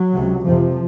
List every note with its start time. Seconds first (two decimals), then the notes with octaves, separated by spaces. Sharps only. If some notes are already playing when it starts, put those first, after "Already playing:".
Already playing: F#3
0.14 C#2 C3
0.46 F2 C3 F3